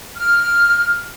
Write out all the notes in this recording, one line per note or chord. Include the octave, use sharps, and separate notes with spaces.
F6